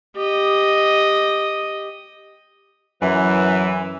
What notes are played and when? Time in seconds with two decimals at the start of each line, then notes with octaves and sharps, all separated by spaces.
0.17 G4 D#5
3.02 F#2 E3